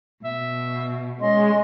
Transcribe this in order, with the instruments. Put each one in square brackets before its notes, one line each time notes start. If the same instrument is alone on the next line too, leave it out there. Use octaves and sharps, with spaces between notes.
[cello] B2 [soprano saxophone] E5
[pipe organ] G#3 [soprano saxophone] C#4 [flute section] D#5 C6